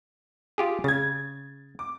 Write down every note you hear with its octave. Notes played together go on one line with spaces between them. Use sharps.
F4 G4 G#4
C#3 G#6 A6
D6